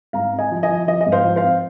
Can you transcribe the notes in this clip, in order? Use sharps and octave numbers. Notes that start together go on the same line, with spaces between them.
G#2 F5 A#5
C4
D#5 G#5
F3
D#5 G#5
F3
F3 D#5
D#5
G#2
C5 F5
F3
C5 F5
C4